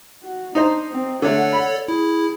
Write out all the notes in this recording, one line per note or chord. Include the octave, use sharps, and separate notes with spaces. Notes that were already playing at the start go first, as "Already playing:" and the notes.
F#4
D4 D#4 C5 A#5
C4
D3 A3 A4 C#5 D5 F#5
B5
E4 G#4